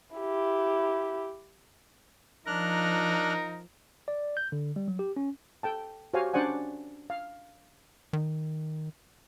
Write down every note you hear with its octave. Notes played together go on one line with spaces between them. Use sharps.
E4 G4
F3 D4 D#4 A#4 F6 F#6
D5
G6
D3
G3
F#3
G4
C#4
A4 G5 A5
F#4 G4 C5 C#5 F5 G#5
C#4 D4 C5 D5 F#5 G#5
F5
D#3